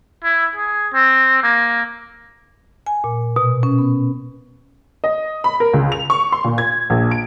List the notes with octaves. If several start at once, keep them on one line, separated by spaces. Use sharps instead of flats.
E4
G#4
C4
A#3
G#5
A#2
B2
C#4
B3
D#5
B5
A#4
C#2
F7
C#6
C6
A#2
G#6
A#1
D7